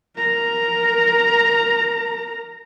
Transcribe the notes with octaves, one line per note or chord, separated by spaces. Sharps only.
A#4 A#5